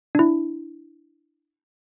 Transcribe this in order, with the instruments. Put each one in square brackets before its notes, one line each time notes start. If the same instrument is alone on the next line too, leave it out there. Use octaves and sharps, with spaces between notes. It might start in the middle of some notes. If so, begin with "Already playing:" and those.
[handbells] D4 E4